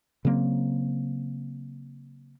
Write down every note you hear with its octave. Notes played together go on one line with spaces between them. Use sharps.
C#3 F#3 A#3 C4